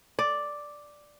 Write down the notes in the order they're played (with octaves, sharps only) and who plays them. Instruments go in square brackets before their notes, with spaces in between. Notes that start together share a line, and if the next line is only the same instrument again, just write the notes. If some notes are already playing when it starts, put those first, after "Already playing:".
[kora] D5